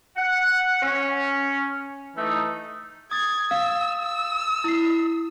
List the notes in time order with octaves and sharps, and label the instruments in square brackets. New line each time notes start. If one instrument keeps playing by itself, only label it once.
[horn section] F#5
C#4
E3 A3 D#4
[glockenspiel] D#6 A6 [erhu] G#6
[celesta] F5 [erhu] E6
[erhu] E6
[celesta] E4 C7